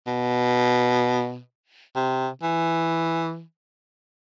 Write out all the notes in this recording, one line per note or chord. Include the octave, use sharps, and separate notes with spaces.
B2
C3
E3